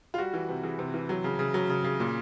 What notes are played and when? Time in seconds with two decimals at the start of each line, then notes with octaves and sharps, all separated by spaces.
0.14 F4
0.18 G3 F#4
0.34 E3
0.49 C3
0.64 E3 G#4
0.79 C3
0.94 E3
1.09 F#3
1.24 C#3
1.39 C#3
1.54 F#3
1.69 C#3
1.84 C#3
2.00 A#2